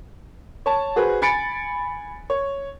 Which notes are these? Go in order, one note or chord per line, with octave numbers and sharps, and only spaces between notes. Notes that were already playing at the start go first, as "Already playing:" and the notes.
C#5 A5
F#4 G#4 B4 C5
G#5 B5 A6 C#7 D7
C#5